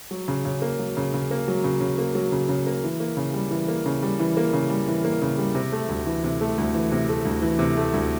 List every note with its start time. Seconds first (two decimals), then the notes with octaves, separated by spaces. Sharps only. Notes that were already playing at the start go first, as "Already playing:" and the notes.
0.11 F#3
0.28 C#3
0.45 C#3
0.62 A#3
0.79 F#3
0.97 C#3
1.14 C#3
1.31 A#3
1.48 F#3
1.64 C#3
1.81 C#3
1.98 A#3
2.15 F#3
2.32 C#3
2.49 C#3
2.66 A#3
2.84 E3
3.00 A#3
3.17 C#3
3.34 G3
3.51 E3
3.68 A#3
3.86 C#3
4.02 G3
4.19 E3
4.37 A#3
4.53 C#3
4.70 G3
4.88 E3
5.04 A#3
5.22 C#3
5.38 G3
5.55 C3
5.72 A3
5.89 D2
6.06 E3
6.24 C3
6.41 A3
6.58 D2
6.74 E3
6.91 C3
7.09 A3
7.25 D2
7.42 E3
7.59 C3
7.77 A3
7.93 D2